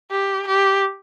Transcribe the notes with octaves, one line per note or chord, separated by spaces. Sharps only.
G4
G4